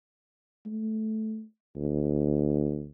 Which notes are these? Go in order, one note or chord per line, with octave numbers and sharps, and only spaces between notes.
A3
D2